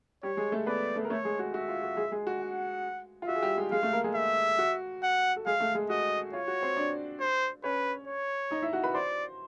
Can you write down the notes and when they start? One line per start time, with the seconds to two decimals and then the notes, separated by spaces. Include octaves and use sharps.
0.23 G3 G4 C#5
0.37 G#3 G#4
0.52 A3 A4
0.66 B3 B4 D5
0.96 A3 A4
1.05 A#4
1.10 A3 A4 C#5
1.25 G#3 G#4
1.39 F#4
1.54 F#4 E5
1.69 F4
1.83 F#4
1.97 G#3 G#4
2.12 G#3 G#4
2.27 F#4
2.41 F#5
3.22 F4
3.28 F#4 E5
3.36 G#4
3.43 G3 G4
3.57 G#3 G#4
3.71 G#3 G#4 F5
3.83 A3 A4
3.93 A#3 A#4
4.04 G#3 G#4
4.15 E5
4.58 F#4
5.03 F#5
5.36 A4
5.46 G#3 G#4 F5
5.60 A3 A4
5.75 G#3 G#4
5.90 F#4 D#5
6.33 F4 C#5
6.48 F#4
6.62 C4 C5
6.77 D4 D5
7.20 C5
7.64 C#4 B4 C#5
8.07 C#5
8.51 D#4 D#5
8.62 E4 E5
8.73 F#4 F#5
8.84 B4 B5
8.94 C5 D5 C6